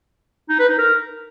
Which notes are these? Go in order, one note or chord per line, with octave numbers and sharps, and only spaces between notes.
D#4
B4
D#4
A#4